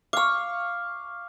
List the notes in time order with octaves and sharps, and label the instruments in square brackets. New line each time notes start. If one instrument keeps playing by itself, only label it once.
[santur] F5 C#6 [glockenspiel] D6 F6